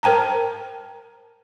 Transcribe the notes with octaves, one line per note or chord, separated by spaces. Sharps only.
A#4 C5 G5 A5 A#5